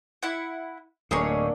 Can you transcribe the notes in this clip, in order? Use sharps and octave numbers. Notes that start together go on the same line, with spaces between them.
E4 F#5
D1 A2 A#3 D4 D#4 G#4 C#5